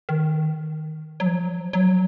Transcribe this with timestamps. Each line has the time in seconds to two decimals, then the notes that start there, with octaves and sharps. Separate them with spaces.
0.09 D#3
1.20 F#3
1.26 F3
1.73 F#3